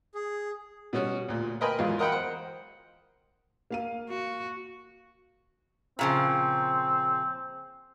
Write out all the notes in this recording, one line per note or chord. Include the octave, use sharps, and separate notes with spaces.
G#4
B2 G3 C#4 F#4
D2 A#2
A#4 B4 D#5 G5 G#5 B5
E2 F#3 G#3 F4
A#4 D#5 F#5 G5 B5
C5 F#5
A#3 F5 D#7
F#4
A#2 C#3 F3 C4